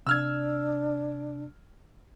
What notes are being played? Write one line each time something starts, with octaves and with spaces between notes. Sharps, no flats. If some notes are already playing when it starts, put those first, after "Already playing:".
C3 D4 E6 F6 G#6